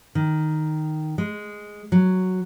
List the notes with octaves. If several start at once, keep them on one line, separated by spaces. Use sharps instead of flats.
D#3
G#3
F#3